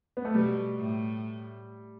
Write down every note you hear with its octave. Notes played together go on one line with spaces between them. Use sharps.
B3
A3
B2 G3
A2